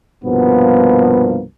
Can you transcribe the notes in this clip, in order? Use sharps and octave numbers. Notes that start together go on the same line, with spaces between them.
C2 G2 B2 F3 A#3 B3